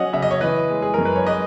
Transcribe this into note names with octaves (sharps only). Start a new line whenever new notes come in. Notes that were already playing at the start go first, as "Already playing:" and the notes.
Already playing: F#3 C#4 D#5 F#5
C#3 E5
D#5
C#5
E3 B4 D#5
G#3
G#4
F#2 A#4
B4
C#5
G#3 B4 D#5